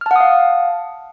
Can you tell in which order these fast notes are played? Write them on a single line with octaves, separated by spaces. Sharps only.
F6 A5 F#5 D#6 F5